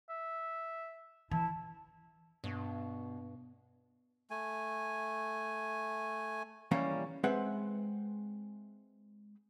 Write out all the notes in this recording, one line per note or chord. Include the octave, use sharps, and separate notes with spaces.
E5
E3 E4 A5
G2 B2
A3 G#5
E3 G3 A#3 C#4 C#5
G#3 C4 B4 E5 F#5